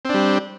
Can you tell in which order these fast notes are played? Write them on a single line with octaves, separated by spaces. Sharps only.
C4 D4 G3